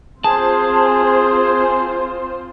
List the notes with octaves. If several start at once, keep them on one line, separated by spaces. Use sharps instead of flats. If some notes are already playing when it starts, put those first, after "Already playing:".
C4 F4 G#4 C5 A5